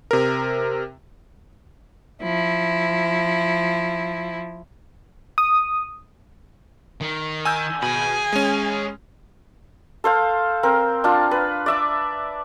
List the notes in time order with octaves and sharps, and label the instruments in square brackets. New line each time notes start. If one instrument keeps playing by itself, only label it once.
[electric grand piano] C3 A#4
[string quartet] F3 E4
[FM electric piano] D#6
[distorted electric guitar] D#3
[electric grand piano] G#5 E6 G6
[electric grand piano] B2 [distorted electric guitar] G#4 B5 [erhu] G#5
[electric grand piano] G#3 C#4
[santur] A4 C5 F5
C4 A#4
D4 F4
B4
D5 E5 D6